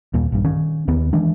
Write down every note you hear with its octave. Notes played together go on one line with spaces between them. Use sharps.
D#2 A#2
A#1 G2
D#3 C#4
D#2 D#3 B3
D#3 E3 G#3 D4